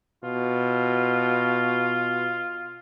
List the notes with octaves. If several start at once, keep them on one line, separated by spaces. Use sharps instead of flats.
B2 F4